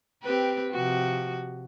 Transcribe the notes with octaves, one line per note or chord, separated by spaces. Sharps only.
C4 G4 B4
C3 F3 F#4